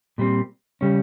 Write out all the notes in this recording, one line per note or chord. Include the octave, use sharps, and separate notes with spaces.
A#2 G3 C4
C#3 G3 C#4